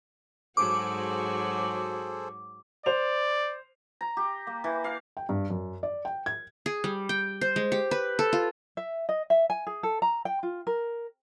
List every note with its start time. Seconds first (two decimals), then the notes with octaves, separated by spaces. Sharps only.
0.57 G#2 F#3 F#4 G#4 A4 C5 D6
2.86 C5 D5 F7
4.01 A#5
4.17 G4
4.47 A#3
4.64 E3
4.84 F5
5.17 G5
5.29 G2
5.50 F#2
5.83 D5
6.05 G5
6.26 G#6
6.66 G#4
6.84 G3
7.09 G5
7.41 C5
7.56 G#3
7.72 G4
7.91 B4
8.19 A4
8.33 F4
8.77 E5
9.09 D#5
9.30 E5
9.50 G#5
9.67 G#4
9.83 A4
10.02 A#5
10.25 G5
10.43 F4
10.67 A#4